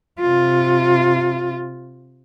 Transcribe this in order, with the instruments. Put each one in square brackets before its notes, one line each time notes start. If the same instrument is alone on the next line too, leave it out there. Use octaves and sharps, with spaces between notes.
[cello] C3 F4